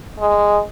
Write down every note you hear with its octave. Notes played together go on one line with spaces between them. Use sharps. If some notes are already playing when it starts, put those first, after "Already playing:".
G#3